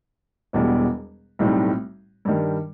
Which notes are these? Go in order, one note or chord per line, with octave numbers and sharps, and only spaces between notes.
E1 E2 B2 G3
B1 A2 G3 C4 D#4
G2 D#3 G3